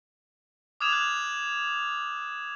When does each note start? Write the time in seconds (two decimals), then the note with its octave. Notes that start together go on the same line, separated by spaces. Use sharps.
0.81 D6 D#6 F6 G#6 E7 F7
0.93 F#6